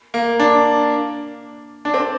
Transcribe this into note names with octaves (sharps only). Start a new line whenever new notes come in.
A#3
D4
D4
C4